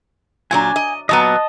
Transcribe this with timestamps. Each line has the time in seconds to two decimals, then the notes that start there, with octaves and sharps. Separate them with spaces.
0.51 A#2 F#3 D4 G#5
0.76 D#5
1.09 A#2 F#3 B3 D#5 A5